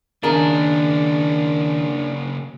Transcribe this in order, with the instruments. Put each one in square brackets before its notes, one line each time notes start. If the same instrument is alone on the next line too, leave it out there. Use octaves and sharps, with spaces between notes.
[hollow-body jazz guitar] D#2 G#4 A#4 [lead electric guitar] C#3 A#3 [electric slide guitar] D4